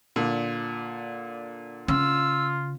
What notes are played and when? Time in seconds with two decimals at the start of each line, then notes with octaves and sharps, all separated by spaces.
0.16 A#2 D3
1.88 C#3 F4 E6